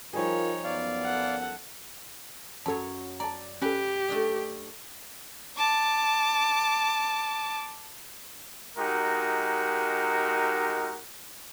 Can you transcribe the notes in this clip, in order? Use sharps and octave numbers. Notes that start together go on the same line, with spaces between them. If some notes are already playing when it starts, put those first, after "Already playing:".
F3 G3 D#4 F4 G#4 A#4 C#5
F#2 B3 D5 F5
A4 F#5
F#2 F#3 A4 C#5 A5
D5 A5 A#5
C#4 G4 A4 B4
A3 D4 D#5
A5 D6
G#3 D#4 F#4 G4 A#4